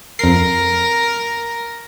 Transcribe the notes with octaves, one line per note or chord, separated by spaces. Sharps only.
F2 A#4 C7